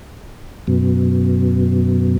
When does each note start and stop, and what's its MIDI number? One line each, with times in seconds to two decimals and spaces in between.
0.67 2.18 42
0.67 2.18 47